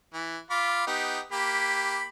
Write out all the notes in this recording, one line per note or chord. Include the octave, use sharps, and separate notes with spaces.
E3
F4 B5 D6
B3 D#4 G4
A#3 G4 B5